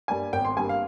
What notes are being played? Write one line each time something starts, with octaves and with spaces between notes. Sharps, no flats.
G2 G3 A#3 G#5
G#1 G5
C6
G2 G3 A#3 G#5
F5